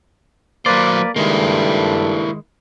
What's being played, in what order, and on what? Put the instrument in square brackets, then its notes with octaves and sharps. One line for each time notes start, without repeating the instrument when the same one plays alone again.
[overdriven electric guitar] F#3 C5 [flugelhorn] A#3 [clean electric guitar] B4 D5
[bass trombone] G2 [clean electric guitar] D#3 G#3 [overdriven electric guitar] A#3 E4 [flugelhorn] A4